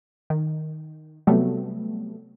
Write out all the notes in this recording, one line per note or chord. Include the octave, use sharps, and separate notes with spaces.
D#3
C3 F#3 G3 A3 B3